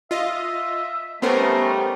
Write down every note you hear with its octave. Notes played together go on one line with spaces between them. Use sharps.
F4 D#5 E5
G3 A3 B3 C#4 D#4 A#4 C5